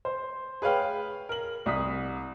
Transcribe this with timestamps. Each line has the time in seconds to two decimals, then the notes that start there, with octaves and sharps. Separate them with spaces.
0.05 C5
0.62 G#4 B4 C#5 F5 G5
1.29 A#4 F#7
1.66 C2 D#6 B6